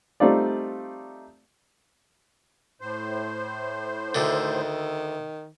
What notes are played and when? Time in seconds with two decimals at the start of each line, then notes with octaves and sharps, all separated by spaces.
0.20 G3 A3 C4 D#4 F4 D5
2.81 A2 C5
4.15 D2 D3 D#3